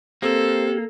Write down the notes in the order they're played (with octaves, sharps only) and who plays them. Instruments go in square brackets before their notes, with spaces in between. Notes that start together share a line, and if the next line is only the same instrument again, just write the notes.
[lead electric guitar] A#3 [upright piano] C4 [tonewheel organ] G4 [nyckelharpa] A4